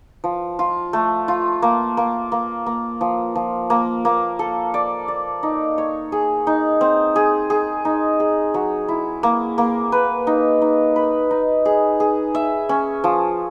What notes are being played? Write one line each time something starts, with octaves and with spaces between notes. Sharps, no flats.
F3
F4
A3
F4
A#3
A#3
A#3
A#3
F3
F3
A#3
A#3
A4
D5
D5
D#4
C#5
G#4
D#4
C4
G#4
G#4
D#4
G#4
F#3
E4
A#3
A#3
B4
D#4
D#4
B4
D#4
G#4
G#4
E5
C#4
F3